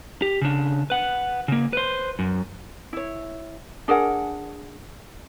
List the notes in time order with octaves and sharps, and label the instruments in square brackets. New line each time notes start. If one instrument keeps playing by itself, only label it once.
[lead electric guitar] G4
C#3 D4
B4 F#5
C#3 A#3
B4 C5
F#2
[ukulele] E4 C#5
D4 G#4 A#4 F#5